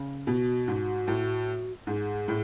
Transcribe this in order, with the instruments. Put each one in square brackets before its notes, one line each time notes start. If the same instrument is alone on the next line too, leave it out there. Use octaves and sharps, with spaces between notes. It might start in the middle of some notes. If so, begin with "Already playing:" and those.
Already playing: [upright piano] C#3
[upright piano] B2 [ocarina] F#4
[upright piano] G#2
A2
[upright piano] G#2 [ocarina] G#4
[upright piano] A2